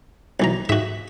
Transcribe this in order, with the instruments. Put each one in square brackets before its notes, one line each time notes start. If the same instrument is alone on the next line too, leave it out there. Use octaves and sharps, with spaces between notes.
[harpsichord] B1 E3 A#5
[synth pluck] G#2 [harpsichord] F#4 E5